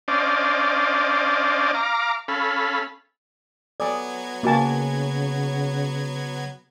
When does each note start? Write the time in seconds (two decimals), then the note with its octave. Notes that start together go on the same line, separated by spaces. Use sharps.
0.08 C#4 D4 C5 D5 D#5 F5
1.74 F5 A#5 D6
2.28 C#4 A4 F5 B5
3.80 F#3 B3 A4 D5 G#5 D#6 G#6
4.43 C#3 A#3 F#4 D#5 G#5 A5